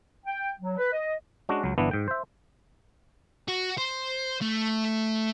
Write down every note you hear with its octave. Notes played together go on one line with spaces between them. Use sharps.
G5
F#3
B4
D#5
G#3 C#4 D4 F#4
C#2 F#3
G1 E3 B3 D4 E4
G#2 G5
C5 E5
F#4
C5
A3